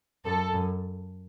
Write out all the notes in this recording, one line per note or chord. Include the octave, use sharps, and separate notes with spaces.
F#2 A4
F#2